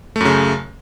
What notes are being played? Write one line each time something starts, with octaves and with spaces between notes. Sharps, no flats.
F#2 C#3 A3